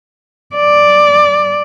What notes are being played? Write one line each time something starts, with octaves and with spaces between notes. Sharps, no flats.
D5